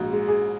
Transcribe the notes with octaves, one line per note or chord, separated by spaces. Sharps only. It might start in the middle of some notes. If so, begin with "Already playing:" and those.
Already playing: A#1 G#2 F#4
G#3
G#4